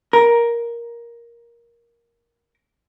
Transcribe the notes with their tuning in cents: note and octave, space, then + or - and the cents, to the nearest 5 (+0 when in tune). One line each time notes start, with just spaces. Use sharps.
A#4 +10